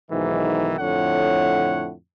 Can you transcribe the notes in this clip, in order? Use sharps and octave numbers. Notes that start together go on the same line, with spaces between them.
B1 G#2 D#3 E3
F2 A2 D3 C#5 F#5